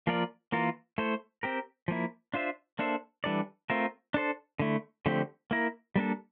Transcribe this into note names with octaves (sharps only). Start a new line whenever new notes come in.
F3 A#3 F4 A#4 D5
E3 A#3 F4 A#4
A3 E4 A4 C5
C4 G4 A#4
F3 A#3 E4
D4 F4 C5 E5
A#3 D4 A4 C5 E5
E3 G3 D4 A4 D5
A3 C4 F4 A#4 E5
D4 A4 C5
D3 A3 E4
D3 F3 A3 C4 G4
A#3 E4 A#4
G3 A#3 D4 A4